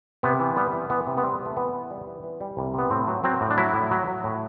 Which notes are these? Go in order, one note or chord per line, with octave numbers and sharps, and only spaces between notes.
C3 B3
E3
G3 B3
E3
E3 B3
C3
B3
G3 C4
C3
A3
E3 B3
E3
G3
E3
E3
G3
C2
C3 B3
A2 C4
F#3
F#3 C4
A2
D4
F#3 E4
A2
F#3
F#3
A2